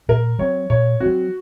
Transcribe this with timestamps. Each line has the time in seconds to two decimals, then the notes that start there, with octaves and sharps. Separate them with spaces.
0.09 A#2 A#4
0.39 F#3 C4 C#5
0.70 A#2 C#5
1.00 C4 F#4
1.06 F#3